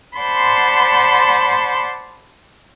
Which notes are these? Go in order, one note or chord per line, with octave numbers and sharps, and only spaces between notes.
C5 D5 F#5 A5 B5 C6